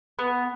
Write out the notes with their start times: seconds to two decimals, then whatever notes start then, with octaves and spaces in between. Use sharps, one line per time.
0.19 B3